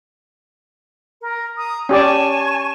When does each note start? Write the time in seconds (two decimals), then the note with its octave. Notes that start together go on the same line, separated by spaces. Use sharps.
1.21 A#4
1.56 A#5 D#6
1.89 C#4 G4 D5 G#5 A5 C#6